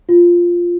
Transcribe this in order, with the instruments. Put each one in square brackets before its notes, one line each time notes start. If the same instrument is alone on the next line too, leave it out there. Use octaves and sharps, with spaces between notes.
[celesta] F4